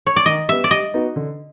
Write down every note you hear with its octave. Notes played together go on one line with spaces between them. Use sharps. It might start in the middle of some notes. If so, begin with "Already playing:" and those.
C#5
D5
D#3 D#5
G3 B3 E5
D5
G3 D#5
B3 D#4 F#4
D3